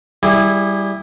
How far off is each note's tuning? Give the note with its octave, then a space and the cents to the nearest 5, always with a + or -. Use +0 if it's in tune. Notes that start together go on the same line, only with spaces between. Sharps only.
G3 +0 E4 +0 G#4 -25